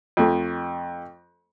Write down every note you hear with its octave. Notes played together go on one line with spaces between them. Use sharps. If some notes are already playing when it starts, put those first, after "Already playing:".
F2 A3